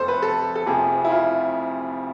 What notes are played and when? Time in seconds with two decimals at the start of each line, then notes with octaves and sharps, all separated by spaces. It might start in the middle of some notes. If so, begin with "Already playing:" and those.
Already playing: F1 F2 A4 C5
0.08 B4
0.22 A4
0.56 A4
0.66 F1 F2 C3 F3 G#4
1.05 E4
1.10 F4